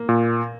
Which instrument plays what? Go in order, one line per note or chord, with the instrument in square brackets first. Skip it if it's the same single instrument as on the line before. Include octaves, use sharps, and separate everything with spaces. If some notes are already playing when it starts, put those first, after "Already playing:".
Already playing: [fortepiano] A#3
[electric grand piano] A#2